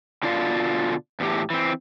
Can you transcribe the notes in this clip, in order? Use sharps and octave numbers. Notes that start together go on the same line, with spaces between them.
B2 D3 F4 D5 F5
E2 A2 G4
E3 C4